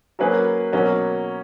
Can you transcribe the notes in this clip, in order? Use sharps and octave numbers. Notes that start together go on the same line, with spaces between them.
F#3 A#3 C#4 G#4 B4
B2 F#3 A#3 C#4